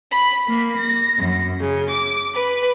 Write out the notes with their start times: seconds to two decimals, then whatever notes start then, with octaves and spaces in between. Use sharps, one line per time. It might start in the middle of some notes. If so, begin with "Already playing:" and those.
0.12 B5
0.46 A#3
0.78 A#6
1.19 F#2
1.60 C#3
1.90 D6
2.35 B4